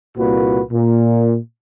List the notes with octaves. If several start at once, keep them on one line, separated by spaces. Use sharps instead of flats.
C2 A#2 A#3 F#4 B4
A#2